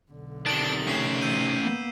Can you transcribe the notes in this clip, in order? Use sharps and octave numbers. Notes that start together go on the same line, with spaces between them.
B1 D3
C3 D#3 D5 A5 D7 F#7 G7
A3 C#4 B6 C7 E7
E6 G6 D#7
A#3 B3